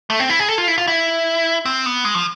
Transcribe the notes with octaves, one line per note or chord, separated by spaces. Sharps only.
A3
C4
E4
G#4
A4
F4
E4
F4
E4
C4
B3
G#3
F3